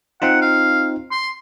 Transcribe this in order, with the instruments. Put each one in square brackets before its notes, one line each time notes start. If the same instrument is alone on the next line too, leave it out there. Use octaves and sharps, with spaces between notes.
[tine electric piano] C4 D#4 F4 [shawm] F#5
[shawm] F5
C6